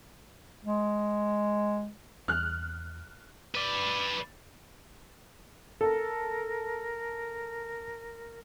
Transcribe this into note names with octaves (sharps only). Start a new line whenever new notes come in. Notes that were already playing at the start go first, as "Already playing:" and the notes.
G#3
E2 F6 F#6
B4 D5
A4 A#4